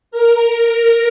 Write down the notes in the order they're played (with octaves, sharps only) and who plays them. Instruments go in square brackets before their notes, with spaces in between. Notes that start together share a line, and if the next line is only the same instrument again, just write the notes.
[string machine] A#4